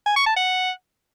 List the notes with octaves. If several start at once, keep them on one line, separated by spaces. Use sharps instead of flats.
G#5
C#6
A5
F#5